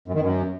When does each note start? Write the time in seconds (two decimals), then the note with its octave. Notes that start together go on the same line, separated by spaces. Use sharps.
0.08 F#2
0.15 D#3
0.21 F#2